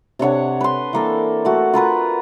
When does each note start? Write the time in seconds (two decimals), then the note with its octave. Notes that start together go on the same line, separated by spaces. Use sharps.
0.19 C3 D4 C#5 F#5
0.61 B4 C6
0.93 E3 A#3 A4
1.45 A3 F#4
1.73 F4 A#4 B4 F#5